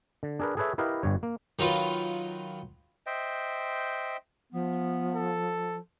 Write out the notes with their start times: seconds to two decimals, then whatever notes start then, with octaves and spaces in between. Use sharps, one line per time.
0.23 D3
0.39 D4 G#4 A#4 B4
0.57 G#4 A4 B4 C#5 E5
0.78 E4 G4 A#4 B4 D#5 F5
1.03 G1 G2 C#5
1.23 A#3
1.59 D#3 F#3 F4 B4
3.06 C5 D#5 E5 G5
4.53 F3 B3
5.15 A4